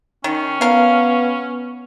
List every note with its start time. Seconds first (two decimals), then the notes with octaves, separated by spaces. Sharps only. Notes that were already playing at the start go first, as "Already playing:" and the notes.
0.24 D#3 C#4
0.61 B3 A#4 F5